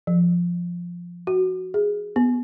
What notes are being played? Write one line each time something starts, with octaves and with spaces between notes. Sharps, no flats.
F3
F#4
G#4
B3